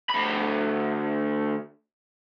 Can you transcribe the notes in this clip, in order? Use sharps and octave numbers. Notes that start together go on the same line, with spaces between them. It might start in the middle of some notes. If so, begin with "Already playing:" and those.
D2 B5